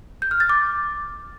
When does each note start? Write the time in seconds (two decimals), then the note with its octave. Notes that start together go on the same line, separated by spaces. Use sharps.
0.22 G6
0.31 F6
0.40 A6
0.49 D6